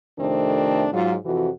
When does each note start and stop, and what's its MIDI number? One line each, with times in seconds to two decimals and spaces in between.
0.19 0.88 41
0.19 0.88 48
0.19 0.88 51
0.19 0.88 57
0.19 0.88 60
0.19 0.88 62
0.93 1.15 44
0.93 1.15 54
0.93 1.15 65
1.25 1.49 41
1.25 1.49 48
1.25 1.49 52
1.25 1.49 66